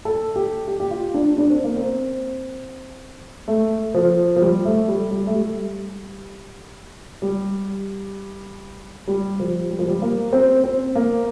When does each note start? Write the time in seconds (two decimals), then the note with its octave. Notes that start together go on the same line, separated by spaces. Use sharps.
0.05 A4
0.36 G4
0.68 G4
0.80 G4
0.91 F4
1.14 D4
1.38 D4
1.50 C4
1.64 A#3
1.76 C4
3.48 A3
3.94 F3
4.36 F3
4.41 G3
4.65 A3
4.88 G3
5.11 G3
5.27 A3
5.35 G3
7.22 G3
9.08 G3
9.40 F3
9.71 G3
9.79 F3
9.88 G3
10.02 A#3
10.33 C4
10.64 C4
10.95 A#3